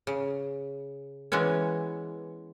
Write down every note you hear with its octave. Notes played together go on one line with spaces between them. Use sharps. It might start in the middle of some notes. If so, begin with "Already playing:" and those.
C#3
E3 G#3 B3 C#4